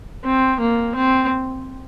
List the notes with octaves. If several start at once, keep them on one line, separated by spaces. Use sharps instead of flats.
C4
A#3
C4